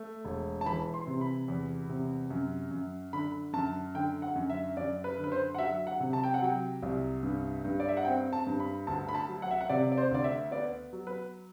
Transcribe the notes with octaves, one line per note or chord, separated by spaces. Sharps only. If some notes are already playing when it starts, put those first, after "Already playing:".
Already playing: A3
E1
A5
E3 B5
C6
C3
B5
E2
C3
F#2
F#2
D3 B5
F#2 A5
D3 G5
F#5
F#2
E5
F#2 D5
B4
D3
B4
C5
F#5
F#3 E5
F#5
C3
A5
G5
F#5
F#3 G5
C2
G2
G2
D5
E5
F#5
C4 G5
A5
G2
B5
D2 A5
B5
A5
F#3
F#5
E5
F#5
C3 D5
D5
C5
D2 D5
E5
B3 D5
F#3
B4